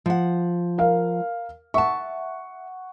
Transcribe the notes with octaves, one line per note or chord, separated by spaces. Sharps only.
F3 F#5
A#4 F5
E5 F#5 A5 C#6